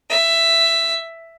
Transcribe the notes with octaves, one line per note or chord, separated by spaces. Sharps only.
E5